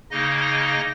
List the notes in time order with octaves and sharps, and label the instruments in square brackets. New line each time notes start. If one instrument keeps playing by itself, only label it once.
[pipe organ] C#3 A#3 D#4 D#5